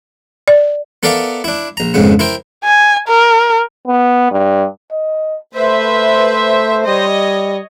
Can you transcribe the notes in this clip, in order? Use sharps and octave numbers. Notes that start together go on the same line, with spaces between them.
D5
B3 A4 A#4 D5 E5 F5
D4 E4
A#1 A#5
F2 G#2 C#3 B3
E4 A#4 C5 G5
G#5
A#4
B3
G2
D#5
A3 B4 C5 E5
G3 C#5 D#5